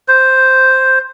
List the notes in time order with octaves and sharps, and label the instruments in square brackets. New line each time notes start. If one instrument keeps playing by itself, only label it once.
[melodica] C5